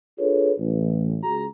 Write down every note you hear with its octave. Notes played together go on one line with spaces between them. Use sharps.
D4 F4 G#4 A4 B4 C#5
A1
C#2 F#4 G#4 A#5